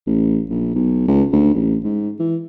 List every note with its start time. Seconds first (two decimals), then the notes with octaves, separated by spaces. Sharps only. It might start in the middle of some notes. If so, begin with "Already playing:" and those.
0.07 A1
0.50 A#1
0.75 B1
1.08 C#2
1.33 D2
1.54 A1
1.84 G#2
2.19 E3